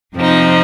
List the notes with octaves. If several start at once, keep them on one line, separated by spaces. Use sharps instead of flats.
F2 C3 F3 C4 D#4